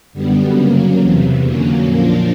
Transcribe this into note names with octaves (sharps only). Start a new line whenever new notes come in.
F#2 D3 G3 B3
C#3 F#3 A#3
E2 C3 E3
F2 D3 F#3 A#3 C#4
A#2 F3 A#3 D4 F4